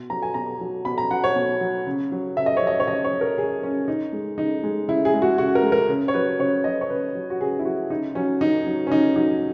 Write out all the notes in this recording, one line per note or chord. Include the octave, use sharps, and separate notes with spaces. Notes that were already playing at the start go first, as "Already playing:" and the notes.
Already playing: B2
F#3 A#5
G#5
B2 A#5
F#3
B2 B5
A#5
F#3 F#5
C#5
B2
F#3
C#3
F#3
C#3 E5
D#5
C#5
F#3 D#5
C#5
C#3 D#5
C#5
F#3
A#4
C#3 G#4
F#3 C#4
C#3 D#4
G#3
C#3 D#4
G#3
C#3 E4
G#4
G#3
F#4
C#3 F#4
A#4
G#3
A#4
C#3
C#5
F#3 B4
C#3 C#5
F#3 D#5
C#5
C#3 B4
F#3
F#4
C#3 G#4
E4
F#3 F#4
C#3 D#4
F#3 C#4
C#3 D#4
F#3
C#4
C#3 D#4
F#3 D#4